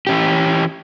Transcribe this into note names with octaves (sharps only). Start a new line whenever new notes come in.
E3 C#4 G4